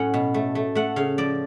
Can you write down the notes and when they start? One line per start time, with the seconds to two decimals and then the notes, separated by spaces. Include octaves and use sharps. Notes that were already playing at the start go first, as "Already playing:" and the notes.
Already playing: A2 F#3 C#4 F#5
0.14 B2
0.34 A3
0.55 A3
0.75 A3 F#5
0.96 C#3 F5
1.18 F3 D5